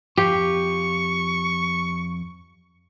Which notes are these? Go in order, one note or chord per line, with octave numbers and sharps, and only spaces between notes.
F2 F4 G4 C#6